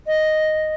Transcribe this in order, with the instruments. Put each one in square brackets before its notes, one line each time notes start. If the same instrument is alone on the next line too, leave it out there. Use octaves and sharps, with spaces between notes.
[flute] D#5